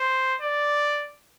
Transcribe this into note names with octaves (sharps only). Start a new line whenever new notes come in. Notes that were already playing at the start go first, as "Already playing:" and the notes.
Already playing: C5
D5